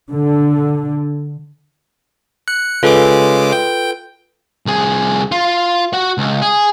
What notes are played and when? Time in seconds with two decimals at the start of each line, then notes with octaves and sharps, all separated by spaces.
0.11 D3
2.48 F#6 C#7
2.83 C#3 G#3 F4 A4 B4 D6
3.52 G5
4.66 C2 G#4
5.32 F4
5.93 F#4 F#5
6.18 C#2
6.42 G#4